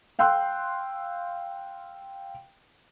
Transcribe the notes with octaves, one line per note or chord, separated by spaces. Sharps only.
F5 G5 C6 E6 F#6